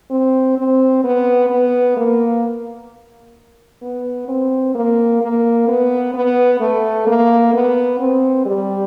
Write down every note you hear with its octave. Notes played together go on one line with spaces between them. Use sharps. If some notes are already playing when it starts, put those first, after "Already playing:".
C4
C4
B3
B3
A#3
B3
C4
A#3
A#3
B3
B3
A3
A#3
B3
C4
G3